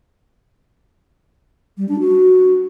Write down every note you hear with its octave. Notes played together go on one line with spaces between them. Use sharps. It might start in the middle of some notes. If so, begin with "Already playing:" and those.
G3
D4
F#4